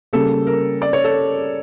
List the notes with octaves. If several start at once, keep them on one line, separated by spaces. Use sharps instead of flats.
C#3 G3 A#3 A4
A#4
D5
C#5
A4